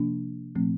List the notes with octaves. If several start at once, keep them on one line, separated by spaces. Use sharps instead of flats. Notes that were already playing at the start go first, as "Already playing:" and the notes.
Already playing: C3 F3 A#3 D4
A#2 F3 A3 C4